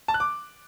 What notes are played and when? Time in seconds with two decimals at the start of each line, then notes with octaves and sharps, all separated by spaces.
0.08 A5
0.14 F#6
0.20 D6